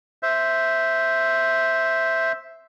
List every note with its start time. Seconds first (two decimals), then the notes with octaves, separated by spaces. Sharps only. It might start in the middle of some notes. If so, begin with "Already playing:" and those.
0.23 C5 E5